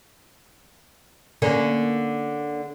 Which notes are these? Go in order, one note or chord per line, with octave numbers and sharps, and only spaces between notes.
D3 A#3 C#4